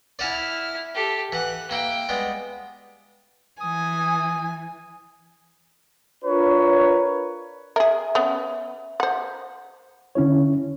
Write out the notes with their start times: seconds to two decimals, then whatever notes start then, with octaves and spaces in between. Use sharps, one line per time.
0.19 E4 D5 F#5 G#5 F6
0.94 G4 A4
1.32 E3 F#5 F#6
1.71 A#3 E4 G5
2.09 G3 G#3 B3
3.61 E3 G#5 D#6
6.25 D4 F4 A#4 B4 C#5
7.76 G#4 A#4 E5
8.15 B3 C#4
9.00 C5 F#5
10.15 D3 C#4 E4 C#5